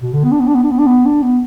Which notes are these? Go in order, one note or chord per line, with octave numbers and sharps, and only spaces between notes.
B2
D3
B3
D4
B3
D4
B3
D4
B3
D4
B3
D4
B3